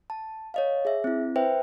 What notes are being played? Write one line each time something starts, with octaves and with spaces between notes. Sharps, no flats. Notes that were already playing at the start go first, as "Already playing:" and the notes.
A5
C#5 D#5 F5
G#4 E5
C4 E4
B4 C5 E5 G5